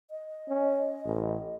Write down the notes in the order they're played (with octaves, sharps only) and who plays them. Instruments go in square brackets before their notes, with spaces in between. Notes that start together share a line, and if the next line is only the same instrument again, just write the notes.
[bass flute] D#5
[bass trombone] C#4
A1